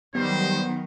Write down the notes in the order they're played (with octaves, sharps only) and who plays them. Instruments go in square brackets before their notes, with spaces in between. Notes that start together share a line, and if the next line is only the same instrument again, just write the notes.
[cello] D#3 F#3 [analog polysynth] G3 [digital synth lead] B3 [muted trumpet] C5